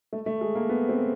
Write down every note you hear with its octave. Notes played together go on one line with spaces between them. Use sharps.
A3
A3
G#3
A#3
B3
C4